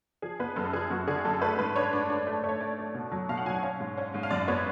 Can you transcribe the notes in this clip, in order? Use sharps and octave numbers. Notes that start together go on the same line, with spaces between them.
F3 G#4
B3 B4
F#2 A4
F3 G#4
F#2 F#4
D3 G#4
F#2 A4
A3 B4
G#2 B4
D4 C#5
D4
D4
A3
A3 C#5
A3 D5
A3
B2
F#3
B2 F5
F#5
F#3 G#5
F#5
C#4 F5
G#2
C#4
G#2
F5
F#2 D5
B3 C#5